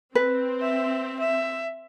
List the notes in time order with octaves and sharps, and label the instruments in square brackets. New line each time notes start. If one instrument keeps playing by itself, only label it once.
[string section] C4 [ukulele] B4
[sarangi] E5
E5